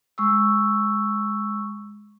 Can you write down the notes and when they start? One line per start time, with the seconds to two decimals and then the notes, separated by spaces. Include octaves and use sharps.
0.18 G#3 C#6 E6